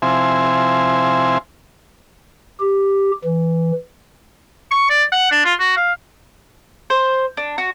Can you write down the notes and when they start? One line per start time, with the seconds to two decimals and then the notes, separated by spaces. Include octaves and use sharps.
0.02 C3 F3 C4 E4 G#5
2.60 G4
3.25 E3
4.71 C#6
4.90 D5
5.12 F#5
5.31 D4
5.45 F4
5.60 F#4
5.77 F5
6.90 C5
7.37 D4
7.58 F#4